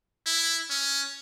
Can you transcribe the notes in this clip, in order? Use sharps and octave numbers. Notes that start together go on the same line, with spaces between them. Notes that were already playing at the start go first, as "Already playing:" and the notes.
E4
C#4